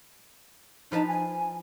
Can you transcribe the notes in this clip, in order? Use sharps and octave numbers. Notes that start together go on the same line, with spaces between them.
F3 D#4 B4 A5
G#5